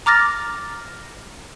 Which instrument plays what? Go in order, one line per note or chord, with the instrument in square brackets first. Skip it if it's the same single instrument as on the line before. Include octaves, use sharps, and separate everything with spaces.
[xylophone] A#5 D6 F6 A6 A#6